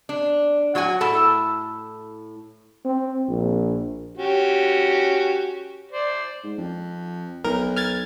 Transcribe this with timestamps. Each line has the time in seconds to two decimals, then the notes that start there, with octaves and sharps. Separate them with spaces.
0.09 D4
0.75 F#3 F#4 F#5 G#5
1.01 A2 E4 A4 A5
2.85 C4
3.29 A#1
4.17 C#4 F#4 G4
5.92 C5 D5
6.44 G#2
6.58 F2
7.44 B1 A#4
7.76 F6 G#6 A6